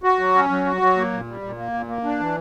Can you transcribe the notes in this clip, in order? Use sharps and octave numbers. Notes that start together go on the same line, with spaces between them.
F#4
F#3
C#4
F#3
F#4
F#3
A#3
A#2
G3
A#2
A#3
A#2
A#3
D4
E3